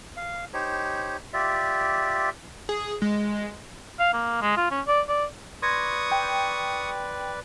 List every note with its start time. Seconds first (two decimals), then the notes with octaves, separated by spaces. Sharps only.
0.17 F5
0.54 D#4 G4 C5 C#5
1.33 F4 G4 D5 E5
2.69 G#4
3.02 G#3
3.99 F5
4.13 A#3
4.42 G#3
4.57 F4
4.71 C#4
4.87 D5
5.09 D5
5.62 B4 D5 C6 C#6 D#6 G#6 A#6
6.12 G5